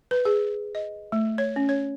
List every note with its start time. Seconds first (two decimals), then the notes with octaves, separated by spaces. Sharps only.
0.11 B4
0.25 G#4
0.75 D#5
1.12 A3
1.38 C#5
1.56 C#4
1.69 C#5